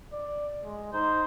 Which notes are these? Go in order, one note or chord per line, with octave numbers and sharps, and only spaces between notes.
D5
G#3
D#4 C5